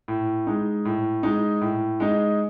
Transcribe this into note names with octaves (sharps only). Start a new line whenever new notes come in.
A2
G#3 D#4
A2
G#3 D#4
A2
G#3 D#4